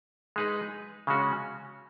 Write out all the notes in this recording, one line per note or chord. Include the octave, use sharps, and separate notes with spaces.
G#3 D#4 G#4 B4
C#3 G#3 C#4 F#4